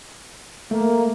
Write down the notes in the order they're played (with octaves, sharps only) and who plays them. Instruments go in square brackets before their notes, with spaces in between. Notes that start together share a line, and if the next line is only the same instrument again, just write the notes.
[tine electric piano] A3 [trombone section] A#3